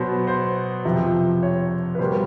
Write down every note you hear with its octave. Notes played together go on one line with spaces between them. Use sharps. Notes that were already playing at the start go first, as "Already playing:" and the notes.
Already playing: B2 F#3 B3 C5
C5
F2 C3 F3
C#5
B4
B2 G3 A#3 C5